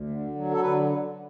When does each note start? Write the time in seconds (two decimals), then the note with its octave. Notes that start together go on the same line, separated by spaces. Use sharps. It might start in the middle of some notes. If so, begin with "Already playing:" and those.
Already playing: D2
0.10 D3
0.35 F#3
0.51 A4
0.61 D3 B4